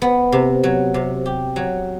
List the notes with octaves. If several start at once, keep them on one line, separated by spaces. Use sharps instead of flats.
B3
C3
F#3
C3
G4
F#3